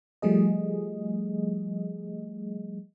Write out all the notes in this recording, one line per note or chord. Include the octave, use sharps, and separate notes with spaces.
F3 G3 A3 G#4 D#5